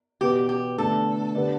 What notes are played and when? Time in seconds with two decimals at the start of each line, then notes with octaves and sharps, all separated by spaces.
0.21 E2 B2 B3 G4
0.49 G4
0.78 E2 D3 A3 D4 A4
1.35 D3 B3 G4 D5